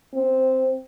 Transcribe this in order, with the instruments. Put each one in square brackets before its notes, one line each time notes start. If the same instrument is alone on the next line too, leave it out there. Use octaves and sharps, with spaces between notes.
[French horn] C4